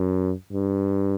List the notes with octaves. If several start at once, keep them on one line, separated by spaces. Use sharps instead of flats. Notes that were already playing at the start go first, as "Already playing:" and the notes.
Already playing: F#2
G2